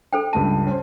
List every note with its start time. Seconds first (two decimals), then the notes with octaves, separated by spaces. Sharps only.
0.13 A4 C5 G5
0.33 C#2 G2 A5 D#7
0.67 C#4 C5